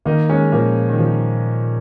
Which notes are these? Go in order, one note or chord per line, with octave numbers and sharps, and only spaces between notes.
D#3 A#3 D#4
G#3 C#4
A#2 F3 A#3
D#3
F3